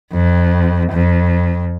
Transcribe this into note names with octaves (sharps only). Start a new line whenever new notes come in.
F2
F2